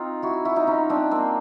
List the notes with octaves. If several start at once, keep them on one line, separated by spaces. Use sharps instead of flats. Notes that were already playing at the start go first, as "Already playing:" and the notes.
Already playing: C4 D#4 F4
E4 F#4
E4 F#4
D#4 F4
C#4 D#4
C4 D4
A#3 C4